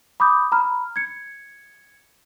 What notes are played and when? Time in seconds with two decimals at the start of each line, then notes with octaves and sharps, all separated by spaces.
0.20 B5 D6 D#6 G6
0.52 A#5 B5 F6
0.96 G#6 C#7